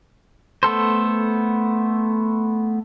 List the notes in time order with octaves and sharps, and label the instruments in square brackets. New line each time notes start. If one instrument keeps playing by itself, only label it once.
[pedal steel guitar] A3 B3 A4 C5